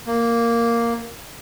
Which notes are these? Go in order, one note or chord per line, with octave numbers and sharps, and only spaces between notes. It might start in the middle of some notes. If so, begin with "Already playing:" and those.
A#3